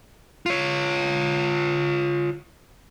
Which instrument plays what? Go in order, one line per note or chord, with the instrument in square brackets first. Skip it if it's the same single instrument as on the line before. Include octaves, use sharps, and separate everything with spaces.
[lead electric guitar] F4 C#5